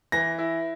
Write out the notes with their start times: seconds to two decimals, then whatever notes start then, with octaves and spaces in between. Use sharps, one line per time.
0.12 E3 A#6
0.38 E4